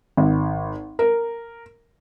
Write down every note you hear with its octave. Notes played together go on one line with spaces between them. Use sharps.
G#1
A#4